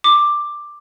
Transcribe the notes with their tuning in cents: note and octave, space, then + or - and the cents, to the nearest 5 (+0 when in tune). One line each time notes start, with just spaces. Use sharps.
D6 +10